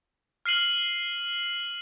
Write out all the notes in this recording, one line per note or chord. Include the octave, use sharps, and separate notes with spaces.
F6 C7 D#7 F#7